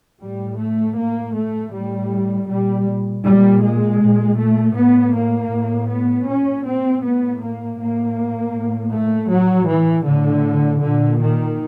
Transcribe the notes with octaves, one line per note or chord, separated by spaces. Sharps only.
A2 G3
A3
A2 A#3
A3
A2 G3
A#2 G3
A#2 G3
G#3
A#2
A3
A2 B3
A#3
A2
B3
A#2 C#4
C4
A2 B3
A#3
A2 A#3
A2
A3
A2 F#3
E3
A2 D3
A#2 D3
D#3